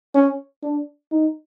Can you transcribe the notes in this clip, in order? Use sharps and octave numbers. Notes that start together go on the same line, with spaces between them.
C#4
D4
D#4